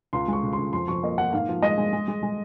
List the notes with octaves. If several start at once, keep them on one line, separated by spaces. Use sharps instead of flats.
C#2 C6
G#3 C#6
C#3
C6
C#2
F2 C6
F2 C#6
A#3 D#5
A#3 F#5
G#2 F5
F3
G#3 D#5
G#3
G#3
G#3
G#3